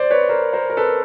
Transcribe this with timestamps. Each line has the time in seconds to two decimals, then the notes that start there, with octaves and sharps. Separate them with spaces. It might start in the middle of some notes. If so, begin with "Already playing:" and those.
Already playing: C5 D5
0.11 B4 C#5
0.29 A#4 C5
0.53 A#4 C5
0.70 A#4
0.77 A4 B4